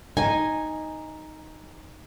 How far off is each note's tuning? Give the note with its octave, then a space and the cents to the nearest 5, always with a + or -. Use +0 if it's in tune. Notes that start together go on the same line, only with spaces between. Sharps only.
D#4 +0 G#5 -5